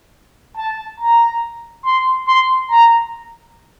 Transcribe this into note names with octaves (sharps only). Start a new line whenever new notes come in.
A5
A#5
C6
C6
A#5